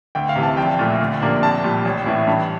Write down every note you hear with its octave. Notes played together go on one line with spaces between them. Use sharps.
D2 G5
F5
C3 E3
A5
A#1 G5
A#2 A3
D2
C3 F3 A#3 D4
A#1 A5
A#2 G3
A1
A2 E3
G2